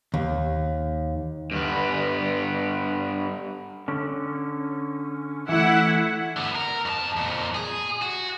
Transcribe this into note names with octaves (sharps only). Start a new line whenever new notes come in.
D#2
G2 B3
D3 C#4
E3 A3 E4 F#5
D3 B3
A#4
F2 A5
F2 A#2
G#4
F#4